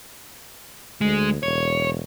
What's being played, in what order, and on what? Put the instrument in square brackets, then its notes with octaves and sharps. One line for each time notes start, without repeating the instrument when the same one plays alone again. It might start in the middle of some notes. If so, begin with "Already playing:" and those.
[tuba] D2 [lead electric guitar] G#3
[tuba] E1 [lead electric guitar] C#5